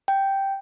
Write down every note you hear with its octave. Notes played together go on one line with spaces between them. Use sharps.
G5